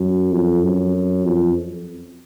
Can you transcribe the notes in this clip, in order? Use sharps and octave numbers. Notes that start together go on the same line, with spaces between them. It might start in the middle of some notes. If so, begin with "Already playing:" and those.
Already playing: F#2
F2
F#2
F2